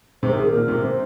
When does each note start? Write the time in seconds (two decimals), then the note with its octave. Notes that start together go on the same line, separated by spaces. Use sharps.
0.23 C3 C5
0.31 D#3 A#4
0.37 G#4
0.46 A#4
0.53 A#2
0.68 C3
0.83 C3 C5